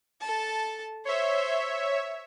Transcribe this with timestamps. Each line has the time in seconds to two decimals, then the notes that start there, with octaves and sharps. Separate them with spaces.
0.21 A4 A5
1.05 C5 C#5 E5